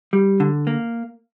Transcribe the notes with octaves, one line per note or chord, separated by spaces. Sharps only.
G3
D3
A#3